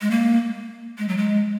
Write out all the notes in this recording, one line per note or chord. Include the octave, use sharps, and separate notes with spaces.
G#3
A#3
G#3
F#3
G#3